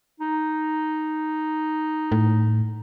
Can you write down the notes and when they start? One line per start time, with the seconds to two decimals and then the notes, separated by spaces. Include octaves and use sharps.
0.20 D#4
2.12 A2